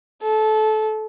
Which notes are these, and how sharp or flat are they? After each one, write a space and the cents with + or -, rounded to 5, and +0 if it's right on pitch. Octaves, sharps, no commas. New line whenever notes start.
A4 -20